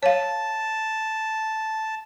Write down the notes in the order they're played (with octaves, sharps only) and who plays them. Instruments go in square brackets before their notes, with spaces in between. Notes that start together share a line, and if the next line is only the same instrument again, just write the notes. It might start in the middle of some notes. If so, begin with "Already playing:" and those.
[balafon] C#5 F5 [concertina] A5